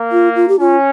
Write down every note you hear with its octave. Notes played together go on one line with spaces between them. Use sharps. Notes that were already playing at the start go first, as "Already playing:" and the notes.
Already playing: A#3
F4
F4
G4
C#4 F4